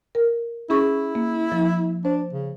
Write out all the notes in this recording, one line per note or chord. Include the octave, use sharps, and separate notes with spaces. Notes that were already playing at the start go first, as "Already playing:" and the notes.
A#4
C#4 E4 G#4 C#6
A#3
F3
D4 C5
C#3